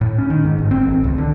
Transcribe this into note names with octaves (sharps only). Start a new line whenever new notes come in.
A2
C#4
D#3
G#2
G1
C4
A1
C#2
D3